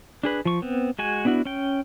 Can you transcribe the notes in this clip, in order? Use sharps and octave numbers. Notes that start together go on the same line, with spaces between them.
D4 G#4 B4
F3 C#6
B3 C4
G#3 F#4 G#5
B3 D4 E4 F#4
C#4 G5